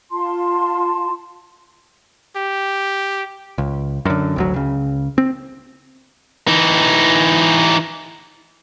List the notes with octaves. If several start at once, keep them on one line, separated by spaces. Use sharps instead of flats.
F4 A5 C6
G4
C#2
F#2 D3
G#1 D2 F#3
C#2 C#3
C4
E3 D#4